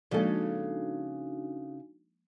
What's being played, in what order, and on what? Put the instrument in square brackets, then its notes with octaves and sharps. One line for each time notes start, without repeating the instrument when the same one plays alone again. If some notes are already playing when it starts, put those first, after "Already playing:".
[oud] C#3 A4 [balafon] F3 G#3 A#3 [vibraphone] D4 D#4 F#4